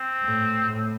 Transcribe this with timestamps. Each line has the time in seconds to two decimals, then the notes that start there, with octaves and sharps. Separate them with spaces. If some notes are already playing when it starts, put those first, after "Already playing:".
Already playing: C4
0.23 A2
0.67 A2